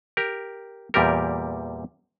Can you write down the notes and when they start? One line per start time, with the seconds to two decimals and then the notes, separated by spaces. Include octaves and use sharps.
0.17 G4 A#4
0.94 E2 A#2 G3 G4 A#4